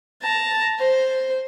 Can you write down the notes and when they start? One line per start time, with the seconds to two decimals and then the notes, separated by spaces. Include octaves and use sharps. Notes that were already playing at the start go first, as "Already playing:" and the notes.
0.22 A5 A#5
0.79 C5